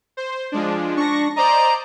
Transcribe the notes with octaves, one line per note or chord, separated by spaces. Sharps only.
C5
F3 G#3 D4
D4 C#6 A#6
C5 D5 D#5 A#5